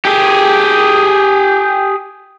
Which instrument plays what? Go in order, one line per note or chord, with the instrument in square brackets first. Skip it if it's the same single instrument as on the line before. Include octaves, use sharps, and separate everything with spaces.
[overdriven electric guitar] G4 G#4